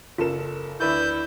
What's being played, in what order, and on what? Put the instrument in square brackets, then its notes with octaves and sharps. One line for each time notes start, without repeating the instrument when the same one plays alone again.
[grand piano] F#1 A4 E7 [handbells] F4 A#4
[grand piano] D2 B4 D5 [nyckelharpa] E4 [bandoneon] G6